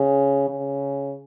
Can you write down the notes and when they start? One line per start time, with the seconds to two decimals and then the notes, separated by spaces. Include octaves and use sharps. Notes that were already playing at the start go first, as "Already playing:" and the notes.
Already playing: C#3
0.49 C#3